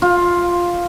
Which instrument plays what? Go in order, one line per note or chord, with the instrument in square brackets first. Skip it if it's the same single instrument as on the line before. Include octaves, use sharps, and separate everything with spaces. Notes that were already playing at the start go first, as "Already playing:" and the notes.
[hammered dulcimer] F4